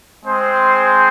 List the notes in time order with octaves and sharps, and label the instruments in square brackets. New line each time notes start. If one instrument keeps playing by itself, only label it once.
[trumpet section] G#3 C4 G#4 C5